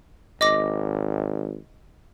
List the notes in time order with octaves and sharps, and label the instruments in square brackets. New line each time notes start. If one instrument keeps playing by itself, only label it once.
[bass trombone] G#1 [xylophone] D#5 D6 A#6